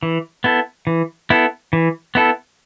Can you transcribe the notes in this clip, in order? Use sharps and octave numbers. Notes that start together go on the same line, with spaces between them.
E3
B3 E4 A4
E3
B3 E4 A4
E3
B3 E4 A4